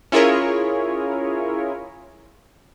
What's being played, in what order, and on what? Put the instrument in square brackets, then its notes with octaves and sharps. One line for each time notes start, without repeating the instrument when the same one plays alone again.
[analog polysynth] C#4 E4 F4 G#4 A#4 C#5